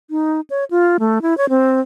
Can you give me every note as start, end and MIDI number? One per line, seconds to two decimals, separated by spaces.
0.10 0.41 63
0.50 0.64 73
0.71 0.97 65
1.00 1.22 57
1.22 1.37 64
1.38 1.49 73
1.49 1.80 60